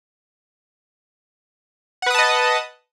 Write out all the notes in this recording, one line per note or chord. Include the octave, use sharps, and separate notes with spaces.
B4 D#5 F#5 A5 D#6